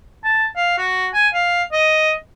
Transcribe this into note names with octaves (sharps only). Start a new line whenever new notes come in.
A5
F5
F#4
G#5
F5
D#5